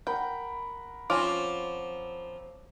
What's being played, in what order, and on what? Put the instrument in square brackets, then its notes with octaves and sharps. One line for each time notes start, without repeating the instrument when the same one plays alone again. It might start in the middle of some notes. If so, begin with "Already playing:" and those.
[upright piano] A#4 F#5 B5 [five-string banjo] G5
[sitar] F3 C4 [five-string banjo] C#4 F4 [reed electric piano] D6